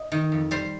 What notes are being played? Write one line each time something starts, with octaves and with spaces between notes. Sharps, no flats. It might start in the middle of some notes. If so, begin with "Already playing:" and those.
Already playing: D#5
D#3
F2
G3 C5